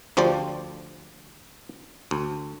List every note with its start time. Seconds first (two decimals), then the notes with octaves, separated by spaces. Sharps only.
0.17 D2 F3 G4 C5 D5
2.11 D2